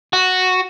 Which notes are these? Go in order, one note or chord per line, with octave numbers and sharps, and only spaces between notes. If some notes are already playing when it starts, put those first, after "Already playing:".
F#4